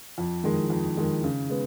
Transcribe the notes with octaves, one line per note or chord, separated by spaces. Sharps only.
F2
D#3 G#3
F2
D#3 G#3
C#3
G#3 B3